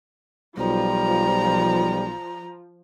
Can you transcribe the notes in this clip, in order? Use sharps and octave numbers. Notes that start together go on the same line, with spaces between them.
B1 F3 G3 A#5